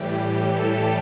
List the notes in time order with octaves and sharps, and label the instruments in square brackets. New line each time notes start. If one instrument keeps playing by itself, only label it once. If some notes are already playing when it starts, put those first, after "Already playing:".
Already playing: [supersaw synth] A2 E3 G3 G4
A4